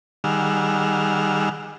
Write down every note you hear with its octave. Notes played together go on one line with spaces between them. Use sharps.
D#3 G3 G#4 F#5 E6 F6